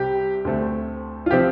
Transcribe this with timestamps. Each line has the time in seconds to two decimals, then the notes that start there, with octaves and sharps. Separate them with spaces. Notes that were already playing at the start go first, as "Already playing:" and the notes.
Already playing: C2 C3 G3 C4 G4
0.45 D2 D3 A3 C4
1.26 F4
1.31 C3 F3 C4 G4